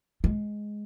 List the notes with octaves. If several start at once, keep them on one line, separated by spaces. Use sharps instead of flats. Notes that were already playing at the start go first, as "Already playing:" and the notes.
G#3